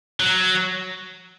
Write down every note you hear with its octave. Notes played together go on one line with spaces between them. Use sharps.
F#3